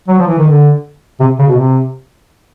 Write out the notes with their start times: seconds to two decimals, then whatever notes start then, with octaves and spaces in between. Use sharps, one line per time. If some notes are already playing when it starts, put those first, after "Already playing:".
0.08 F#3
0.18 F3
0.27 E3
0.38 D#3
0.48 D3
1.20 C3
1.39 C#3
1.48 B2
1.57 C3